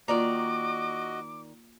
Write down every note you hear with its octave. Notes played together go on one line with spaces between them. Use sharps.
D#3 A#3 F4 F#4 D5 D#5 A#5 D6